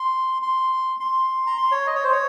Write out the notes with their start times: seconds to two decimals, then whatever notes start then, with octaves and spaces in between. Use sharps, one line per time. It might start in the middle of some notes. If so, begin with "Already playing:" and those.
Already playing: C6
0.42 C6
1.00 C6
1.47 A#5
1.58 C6
1.72 C#5
1.87 D#5
1.95 C#5
2.04 C5
2.12 C#5